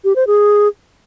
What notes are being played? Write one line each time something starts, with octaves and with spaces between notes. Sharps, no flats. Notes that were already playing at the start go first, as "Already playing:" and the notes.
G4
C5
G#4